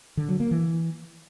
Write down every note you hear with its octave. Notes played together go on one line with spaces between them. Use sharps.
D3
F#3
A#3
E3